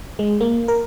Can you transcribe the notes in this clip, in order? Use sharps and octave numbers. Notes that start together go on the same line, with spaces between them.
G#3
A#3
A#4